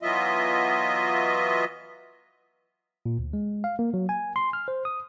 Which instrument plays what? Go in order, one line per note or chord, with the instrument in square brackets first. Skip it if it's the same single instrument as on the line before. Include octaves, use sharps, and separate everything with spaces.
[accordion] E3 F#3 B3 F4 D#5 E5
[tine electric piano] A#2
D2
G#3
F5
A#3
F#3
G#5
C6
F6
C5
D#6